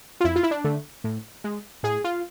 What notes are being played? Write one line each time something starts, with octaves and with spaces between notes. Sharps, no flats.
F4
F2 E4
F4
E4
D4
D3 A3
A2
G#3
A2 G#4
F4